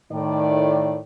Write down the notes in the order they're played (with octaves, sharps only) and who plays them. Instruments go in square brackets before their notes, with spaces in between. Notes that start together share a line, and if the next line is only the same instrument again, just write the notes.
[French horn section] A2 D#3 D5